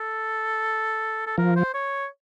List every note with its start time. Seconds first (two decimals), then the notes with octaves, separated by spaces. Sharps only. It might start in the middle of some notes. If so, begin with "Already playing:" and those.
Already playing: A4
1.27 A4
1.38 F3 A#4
1.56 C5
1.74 C#5